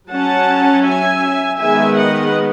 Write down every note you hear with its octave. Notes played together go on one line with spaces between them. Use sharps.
F#3 C#4 F#5 A5
E5 G#5
D#3 G#3 B3 E5 G#5
D#5 F#5